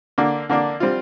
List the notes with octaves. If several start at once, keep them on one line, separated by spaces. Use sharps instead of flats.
D3 A#3 D4
D3 A#3 D4
G3 C4 F4